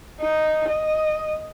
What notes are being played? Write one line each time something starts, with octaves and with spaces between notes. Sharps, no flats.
D#4
D#5